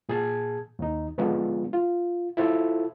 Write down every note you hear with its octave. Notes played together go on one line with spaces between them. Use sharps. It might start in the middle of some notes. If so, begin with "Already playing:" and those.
A#2 G#4 A5 G#6
D#2 D#4
D3 F3 G#3 B3 D4 F4
F4
E4 F4 A4 C5